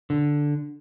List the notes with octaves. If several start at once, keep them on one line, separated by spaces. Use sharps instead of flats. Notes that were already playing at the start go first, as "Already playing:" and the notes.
D3